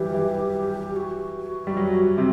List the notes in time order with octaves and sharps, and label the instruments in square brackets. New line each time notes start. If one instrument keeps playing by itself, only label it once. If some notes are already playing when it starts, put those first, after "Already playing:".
Already playing: [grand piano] E3 F#3 G3 [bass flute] G4
[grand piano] E3
[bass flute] F#4
[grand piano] G3
F#3
C3